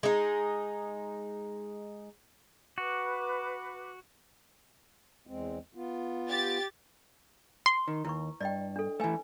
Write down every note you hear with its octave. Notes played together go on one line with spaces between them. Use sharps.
G#3 D#4
F#4 B4 D6
E2 G#3 C4
B3 F4
G4 A6
C6
D#3
D#2 E4 B4 C#6
G2 D5 D#5 G5
D4 A4
E3 A3 B4 G#5